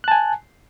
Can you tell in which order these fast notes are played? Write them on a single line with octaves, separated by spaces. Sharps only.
F#6 A5 G#5